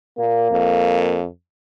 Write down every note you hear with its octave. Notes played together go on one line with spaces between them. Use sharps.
A#2 A#3
F2